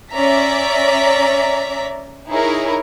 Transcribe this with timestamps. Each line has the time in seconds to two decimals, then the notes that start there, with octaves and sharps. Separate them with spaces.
0.13 C#4 D5 E5 A#5 B6
2.30 D#4 E4 G#4 A#4 C#5